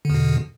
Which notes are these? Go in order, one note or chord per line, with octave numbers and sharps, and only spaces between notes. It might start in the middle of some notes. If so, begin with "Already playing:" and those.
E2 B2 D3